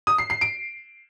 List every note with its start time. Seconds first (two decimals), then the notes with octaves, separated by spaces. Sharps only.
0.07 D#6
0.18 C7
0.30 C7
0.41 D7